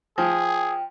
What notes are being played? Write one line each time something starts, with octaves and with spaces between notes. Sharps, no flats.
F3 G#4 G5